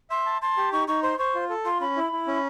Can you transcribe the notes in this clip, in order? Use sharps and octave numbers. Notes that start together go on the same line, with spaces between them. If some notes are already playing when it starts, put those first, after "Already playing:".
E5 C6
A5
A5 C6
G4
D#4 C#6
D#4 C#6
C5 C6
C5 C#6
F4
A4
F4 C6
C#4 B5
E4
E4
C#4